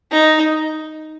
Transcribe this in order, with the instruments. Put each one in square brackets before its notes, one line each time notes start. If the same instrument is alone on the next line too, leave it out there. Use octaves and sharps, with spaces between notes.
[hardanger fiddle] D#4